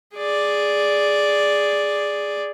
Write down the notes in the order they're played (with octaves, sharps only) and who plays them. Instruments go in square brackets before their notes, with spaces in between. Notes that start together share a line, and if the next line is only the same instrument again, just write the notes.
[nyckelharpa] G#4 D5